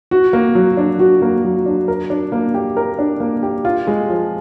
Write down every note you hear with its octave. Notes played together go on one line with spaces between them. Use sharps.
F#4
A#3
F#3
D4
F#4
A#3
F#3
D4
A#4
D4
A#3
G4
A#4
D4
A#3
G4
F4
G#3
F3